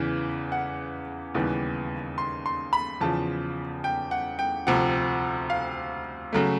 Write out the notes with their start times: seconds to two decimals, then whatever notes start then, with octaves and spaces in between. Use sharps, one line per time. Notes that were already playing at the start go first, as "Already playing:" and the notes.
Already playing: E2 C#3 E3
0.52 F#5
1.34 D#2 C#3 E3 G3 B3
2.18 C6
2.46 C6
2.73 B5
3.01 E2 C#3 F3 A5
3.84 G5
4.11 F#5
4.39 G5
4.67 D2 C3 F3 F#5
5.50 F5
6.33 C#3 F#3 A3